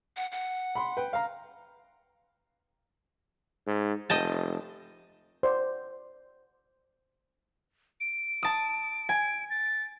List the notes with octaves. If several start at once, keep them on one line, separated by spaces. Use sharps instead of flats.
F#5
F#5
B5 C6
B4 G5
F5 A#5
G#2
F1 D#5 G5 A5
C5 D5
D7
A5 D#6
G#5
A6